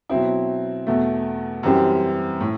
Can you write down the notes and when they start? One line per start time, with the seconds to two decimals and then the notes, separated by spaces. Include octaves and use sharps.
0.09 B2 F#3 C4 E4
0.87 E2 B2 A3
1.63 F#2 E3 G3 C4 G4
2.40 A2